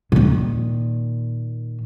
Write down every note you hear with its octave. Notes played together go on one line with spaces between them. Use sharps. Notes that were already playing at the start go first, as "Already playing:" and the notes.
A#2 D#3